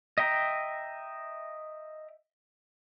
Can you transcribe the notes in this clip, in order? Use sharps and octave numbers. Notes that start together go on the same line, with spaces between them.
D#5 E5 G5 A#5